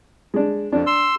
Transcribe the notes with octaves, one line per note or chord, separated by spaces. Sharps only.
G#3 D4
F2 D4
C6 E6